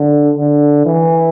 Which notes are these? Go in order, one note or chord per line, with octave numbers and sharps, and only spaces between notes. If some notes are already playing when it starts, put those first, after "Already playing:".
Already playing: D3
D3
E3